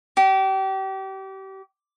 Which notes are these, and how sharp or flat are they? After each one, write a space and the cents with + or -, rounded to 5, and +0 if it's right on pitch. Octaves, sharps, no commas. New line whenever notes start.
G4 -30